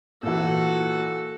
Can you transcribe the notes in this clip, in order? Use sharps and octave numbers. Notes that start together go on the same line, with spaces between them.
A#2 E3 F#4 A4